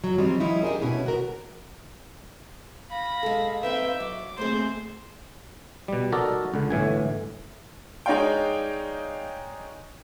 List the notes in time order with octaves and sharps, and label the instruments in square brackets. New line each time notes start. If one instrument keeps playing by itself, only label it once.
[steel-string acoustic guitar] F#2 F#3
D#3 F3 G3 C4 D#4
F3 G3 C#4 D#4 E4
D4 G4 G#4 A#4
B2 C#4 E4
D#2 F#4 A#4
[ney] F5 [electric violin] B5 A#6
[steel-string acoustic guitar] G#3 A4
[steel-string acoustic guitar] C4 D#4 B4 [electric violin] E5 G5
[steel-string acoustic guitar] F#3 E5 [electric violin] D6
[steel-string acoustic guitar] D#2 A2 G#4 [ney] A3 [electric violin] C4 C5
[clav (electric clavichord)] B2 G3
D#4 F#4 A4 A#4 D5 D#5
C#2 D3
G1 A2 E3 G#5
[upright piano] G#3 D#4 C#5 D5 F5 G5